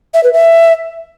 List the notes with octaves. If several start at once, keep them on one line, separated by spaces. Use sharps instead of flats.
E5
B4
E5